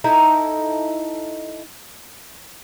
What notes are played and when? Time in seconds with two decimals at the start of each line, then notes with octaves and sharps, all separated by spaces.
0.04 D#4 E4 A4 D#5